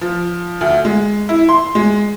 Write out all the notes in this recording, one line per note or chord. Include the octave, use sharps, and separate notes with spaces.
F3
D2
G#3
E4
C6
G#3